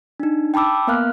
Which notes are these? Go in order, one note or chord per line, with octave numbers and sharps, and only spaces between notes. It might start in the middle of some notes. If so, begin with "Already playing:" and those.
D4 D#4
G5 A5 B5 D6 E6
A#3 B3 A#4 F5 F6 F#6